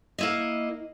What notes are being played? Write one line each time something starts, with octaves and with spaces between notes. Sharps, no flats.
A#3 E4 D#5